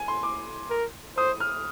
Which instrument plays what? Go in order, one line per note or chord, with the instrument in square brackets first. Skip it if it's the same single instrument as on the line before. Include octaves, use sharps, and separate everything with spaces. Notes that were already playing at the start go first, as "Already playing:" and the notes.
Already playing: [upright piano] G#5
C6
D6
[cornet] A#4
[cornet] C5 [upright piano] D#6
[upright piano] F6